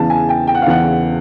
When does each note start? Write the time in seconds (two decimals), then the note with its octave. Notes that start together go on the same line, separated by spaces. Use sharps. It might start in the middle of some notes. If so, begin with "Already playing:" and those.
Already playing: E2 C#3 E3 A5
0.10 G#5
0.29 G5
0.47 G5
0.54 F#5
0.62 F5
0.66 E2 C#3 E3 F#5